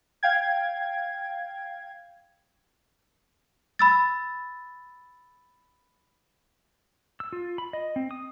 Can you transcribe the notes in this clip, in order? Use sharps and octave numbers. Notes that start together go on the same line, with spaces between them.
F5 G5 G#6
B5 E6 A6
E6
F4
B5
D#5
C4
D#6